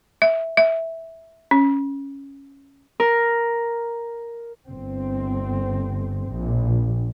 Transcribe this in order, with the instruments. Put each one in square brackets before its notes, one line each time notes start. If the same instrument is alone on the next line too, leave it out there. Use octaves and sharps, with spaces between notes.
[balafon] E5
E5
C#4
[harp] A#4
[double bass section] G1 C4
A#1